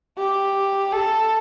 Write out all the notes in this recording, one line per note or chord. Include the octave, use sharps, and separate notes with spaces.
G4
A4